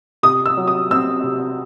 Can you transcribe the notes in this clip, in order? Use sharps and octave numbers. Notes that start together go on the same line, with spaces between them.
C3 D#6
E6
F#3
D#6
C4 E6
C3